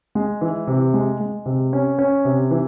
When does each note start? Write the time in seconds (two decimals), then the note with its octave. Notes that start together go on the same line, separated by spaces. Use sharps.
0.15 G#3
0.41 E3
0.67 C3
0.94 G#3
1.20 G#3
1.46 C3
1.73 C#4
1.99 C#4
2.25 C3
2.51 E3